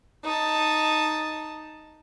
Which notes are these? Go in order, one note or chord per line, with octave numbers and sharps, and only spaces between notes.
D#4 A5